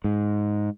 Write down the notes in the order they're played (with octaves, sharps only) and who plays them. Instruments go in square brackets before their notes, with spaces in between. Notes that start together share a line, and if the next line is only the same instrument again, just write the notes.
[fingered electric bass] G#2